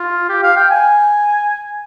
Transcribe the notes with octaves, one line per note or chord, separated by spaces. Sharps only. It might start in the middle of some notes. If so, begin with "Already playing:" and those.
Already playing: F4
G4
F5
G5
G#5